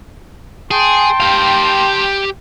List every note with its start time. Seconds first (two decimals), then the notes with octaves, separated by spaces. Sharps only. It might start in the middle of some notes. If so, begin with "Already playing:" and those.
0.71 G#4 G5 A5 C6
1.20 G4 F5